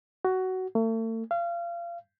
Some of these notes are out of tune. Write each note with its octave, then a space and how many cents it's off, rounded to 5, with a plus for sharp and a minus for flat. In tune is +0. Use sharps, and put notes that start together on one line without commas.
F#4 +15
A3 +40
F5 -30